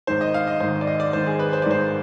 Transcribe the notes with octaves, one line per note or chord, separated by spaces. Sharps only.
G#1 G#2 D#3 C5
D#5
F5
D#5
G#1 G#2 D#3 C5
D5
D#5
D5
G#1 G#2 D#3 C5
G#4
B4
C5
D5
G#1 G#2 D#3 C5